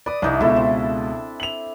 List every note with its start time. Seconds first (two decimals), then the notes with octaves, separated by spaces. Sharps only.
0.06 B4 D5 D#6
0.22 C2 D4 D#4 E5
0.40 C#2 B2 E4 A4
0.56 C4
1.40 F7 F#7